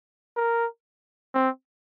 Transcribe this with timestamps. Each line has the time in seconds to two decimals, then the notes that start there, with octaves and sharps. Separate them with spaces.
0.37 A#4
1.34 C4